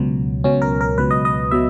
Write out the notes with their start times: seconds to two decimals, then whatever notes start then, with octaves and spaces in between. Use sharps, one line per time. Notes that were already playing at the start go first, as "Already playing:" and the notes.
Already playing: C#2 B2 F#3
0.44 C#2 B2 F#3 C#4
0.62 A#4
0.81 A#4
0.98 C#2 B2 F#3 B4
1.11 D#5
1.25 D#5
1.51 B2 F#3 E5